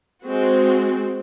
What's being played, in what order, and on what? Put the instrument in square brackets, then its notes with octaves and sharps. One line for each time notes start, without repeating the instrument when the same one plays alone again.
[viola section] G#3 C4 F#4